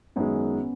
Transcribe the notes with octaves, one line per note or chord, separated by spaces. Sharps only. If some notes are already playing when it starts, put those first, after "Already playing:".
F#2 D#3 G#3 B3 C#4